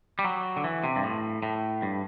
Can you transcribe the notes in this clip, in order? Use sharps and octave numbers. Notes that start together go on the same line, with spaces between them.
G3
F#3
D3
E3
C3
G2
A2
A2
G2